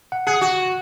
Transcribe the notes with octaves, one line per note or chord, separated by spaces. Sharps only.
F#5
G#4 F#5
F#4